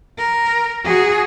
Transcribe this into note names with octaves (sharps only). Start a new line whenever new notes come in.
A#4
F#4 G#4